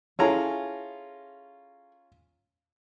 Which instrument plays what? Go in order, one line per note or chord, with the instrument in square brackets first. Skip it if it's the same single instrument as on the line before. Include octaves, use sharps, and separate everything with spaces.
[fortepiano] C#4 F4 A#5 [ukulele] E4 G#4 A4